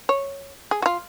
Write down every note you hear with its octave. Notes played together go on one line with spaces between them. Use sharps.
C#5
G#4
F#4
F4